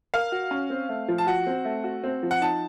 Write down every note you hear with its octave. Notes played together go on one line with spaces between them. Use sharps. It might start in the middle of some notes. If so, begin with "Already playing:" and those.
A#4 F5
F#4
C#4
C4
A3
F3
A5
F#4 F#5
C4
A3
F#4
C4
F3
F#5
D#4 A5